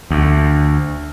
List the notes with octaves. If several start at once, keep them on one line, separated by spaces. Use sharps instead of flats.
D2